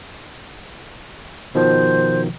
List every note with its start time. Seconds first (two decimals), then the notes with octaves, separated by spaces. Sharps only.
1.55 B2 D#3 F3 C5